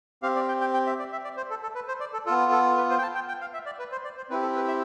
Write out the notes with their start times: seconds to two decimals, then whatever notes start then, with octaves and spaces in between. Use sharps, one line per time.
0.23 C4 G4 F5
0.36 D5
0.48 G5
0.61 G5
0.74 G5
0.86 E5
0.99 D5
1.12 E5
1.24 D5
1.37 C5
1.50 A4
1.62 A4
1.75 B4
1.88 C5
2.00 D5
2.13 A4
2.26 B3 F4 A4
2.51 A4
2.77 B4
2.90 C5
2.98 G5
3.02 A5
3.15 G5
3.28 G5
3.41 F5
3.54 E5
3.66 D5
3.79 B4
3.92 C5
4.04 D5
4.17 C5
4.30 C4 E4 G4 B4
4.42 A4
4.56 B4
4.68 E5